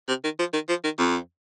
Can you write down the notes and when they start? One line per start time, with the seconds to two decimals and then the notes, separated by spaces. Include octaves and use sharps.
0.09 C3
0.24 D#3
0.39 F3
0.54 D#3
0.69 F3
0.84 D#3
0.98 F2